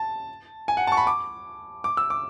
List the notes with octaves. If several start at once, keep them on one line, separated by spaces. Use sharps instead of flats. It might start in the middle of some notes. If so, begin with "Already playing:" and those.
Already playing: A5
G#5
F#5
A5 C#6
B5
D6
D6
E6
D6